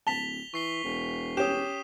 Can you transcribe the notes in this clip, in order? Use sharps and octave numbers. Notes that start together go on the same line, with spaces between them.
D1 A5 B6 F7 G7
E3 C#6 C7 G7
E1
C#4 G4 D#6 E7